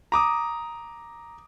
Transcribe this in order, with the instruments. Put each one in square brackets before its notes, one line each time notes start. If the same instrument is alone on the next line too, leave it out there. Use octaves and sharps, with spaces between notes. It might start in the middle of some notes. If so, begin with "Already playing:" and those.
[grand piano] A#5 D6 D#6